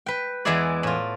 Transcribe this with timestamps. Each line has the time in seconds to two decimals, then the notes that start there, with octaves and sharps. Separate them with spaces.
0.06 B4 G5
0.45 E2 E3 G#3 E4 G#4 D5
0.83 A2 F4